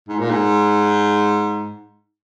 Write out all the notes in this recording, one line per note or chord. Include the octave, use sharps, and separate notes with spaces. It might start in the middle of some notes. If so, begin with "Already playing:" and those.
G#2
A#2
G#2